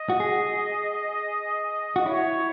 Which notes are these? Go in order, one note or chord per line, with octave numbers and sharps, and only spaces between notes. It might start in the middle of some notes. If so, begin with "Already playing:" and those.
Already playing: D#5
F#4
G#4
F#4
E4 C#5